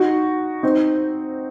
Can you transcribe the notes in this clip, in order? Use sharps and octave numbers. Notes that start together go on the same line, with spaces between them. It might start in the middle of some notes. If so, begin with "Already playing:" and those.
Already playing: D#4 F#4
C4 D#4